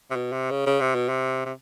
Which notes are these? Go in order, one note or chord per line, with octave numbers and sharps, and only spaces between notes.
C3
B2
C3
C#3
C#3
C3
B2
C3
C3